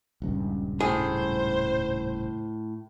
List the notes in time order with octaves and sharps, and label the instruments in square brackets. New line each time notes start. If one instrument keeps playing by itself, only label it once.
[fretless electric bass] D#1 C#2 G2
[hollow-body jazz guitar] A2 G#4 [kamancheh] C5